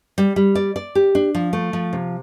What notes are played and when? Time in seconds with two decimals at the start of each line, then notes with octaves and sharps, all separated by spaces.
0.18 G3
0.36 G3
0.55 D5
0.76 D5
0.95 G4
1.15 D4
1.35 F3
1.53 A3
1.73 F3
1.93 C3